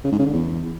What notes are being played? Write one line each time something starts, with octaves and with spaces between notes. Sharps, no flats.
C#3
G#2
C#3
D3
E2